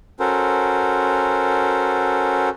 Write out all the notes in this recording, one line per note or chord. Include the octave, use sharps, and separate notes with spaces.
C#4 F#4 A4 A#4 C5